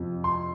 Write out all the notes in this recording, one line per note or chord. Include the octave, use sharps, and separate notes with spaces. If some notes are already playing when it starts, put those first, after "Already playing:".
Already playing: F2 C3 F3
C6